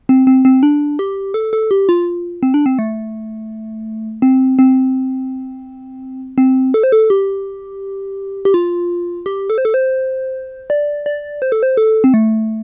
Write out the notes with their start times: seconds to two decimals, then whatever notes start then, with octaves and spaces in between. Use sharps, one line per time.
0.09 C4
0.27 C4
0.45 C4
0.63 D4
0.99 G4
1.34 A4
1.53 A4
1.71 G4
1.89 F4
2.43 C4
2.54 D4
2.66 C4
2.79 A3
4.22 C4
4.59 C4
6.38 C4
6.74 A4
6.83 C5
6.92 A4
7.10 G4
8.45 G4
8.54 F4
9.26 G4
9.50 A4
9.58 C5
9.65 A4
9.74 C5
10.70 D5
11.06 D5
11.42 C5
11.52 A4
11.63 C5
11.77 A4
12.04 C4
12.14 A3